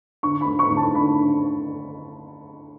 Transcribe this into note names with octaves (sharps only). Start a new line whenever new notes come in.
D3 C#6
B5
D2
C#6
D2
A5
D3 B5
D3